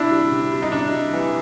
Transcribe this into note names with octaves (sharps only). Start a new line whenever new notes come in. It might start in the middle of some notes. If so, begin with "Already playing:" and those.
Already playing: C3 D4 E4
G3
C3
G3
D#4
C3 D4
G3
E3